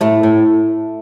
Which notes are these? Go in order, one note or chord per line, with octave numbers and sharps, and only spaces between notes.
A2 A3
A2